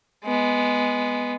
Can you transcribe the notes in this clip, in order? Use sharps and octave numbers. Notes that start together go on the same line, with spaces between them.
G#3 B3